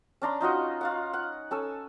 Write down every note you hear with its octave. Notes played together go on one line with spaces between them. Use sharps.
C#4 D4 A#5 C6
D#4 F4 F#4 D#5
F4 F5 F#5
F#5
C#4 A4 G#5 E6